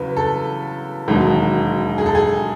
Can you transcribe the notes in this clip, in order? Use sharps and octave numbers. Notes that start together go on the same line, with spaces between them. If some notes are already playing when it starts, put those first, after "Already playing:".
Already playing: E2 C#3 F#3 B4
A4
E1 D#2 D#3 F#3
G#4
A4
G#4